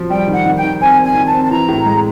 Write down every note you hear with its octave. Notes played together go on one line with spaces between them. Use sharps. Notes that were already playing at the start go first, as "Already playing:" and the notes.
Already playing: F3
G3 G5
D#3
F#5
D#3
G5
D#3
C4 G#5
C4
G#5
D#3
A5
C4
A5
E3 A#5
A2
G#3